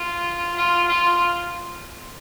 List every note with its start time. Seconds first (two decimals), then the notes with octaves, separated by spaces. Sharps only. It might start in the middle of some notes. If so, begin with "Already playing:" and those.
Already playing: F4
0.56 F4
0.88 F4